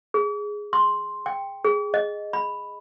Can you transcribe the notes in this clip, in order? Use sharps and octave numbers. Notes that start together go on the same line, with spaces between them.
G#4
C6
G5
G#4
D#5
B5